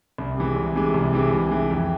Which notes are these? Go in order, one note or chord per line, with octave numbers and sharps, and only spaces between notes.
C2
C3 E3 G#3
C2
C3 E3 G#3
C2
C3 E3 G#3
C2
C3 E3 G#3
F2